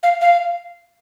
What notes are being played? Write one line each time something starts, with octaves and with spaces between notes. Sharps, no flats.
F5
F5